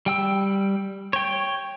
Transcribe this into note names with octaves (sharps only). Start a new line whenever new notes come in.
G3 G5 E6
C#5 G5